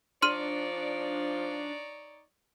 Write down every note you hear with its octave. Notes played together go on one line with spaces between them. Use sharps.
F3 D4 D#4 C#5 D5 C6 F6 D#7